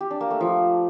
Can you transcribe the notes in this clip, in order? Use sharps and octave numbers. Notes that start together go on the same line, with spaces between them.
G4
D4
A#3
A3
F3